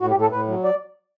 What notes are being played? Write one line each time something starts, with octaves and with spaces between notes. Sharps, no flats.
A2 F#4
G4
A2
A4
A2 B4
F#3
D5